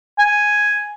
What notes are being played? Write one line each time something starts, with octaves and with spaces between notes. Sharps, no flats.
G#5